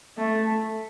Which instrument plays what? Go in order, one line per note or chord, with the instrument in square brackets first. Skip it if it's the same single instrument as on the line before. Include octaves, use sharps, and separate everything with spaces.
[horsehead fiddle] A3